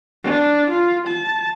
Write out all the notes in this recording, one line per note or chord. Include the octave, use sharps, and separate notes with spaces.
D4
F4
A5